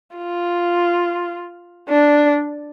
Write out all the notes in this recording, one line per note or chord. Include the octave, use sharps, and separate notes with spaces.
F4
D4